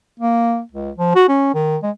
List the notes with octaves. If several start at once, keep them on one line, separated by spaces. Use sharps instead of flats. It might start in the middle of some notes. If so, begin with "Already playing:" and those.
A#3
C#2
F3
F#4
C#4
D#3
G#3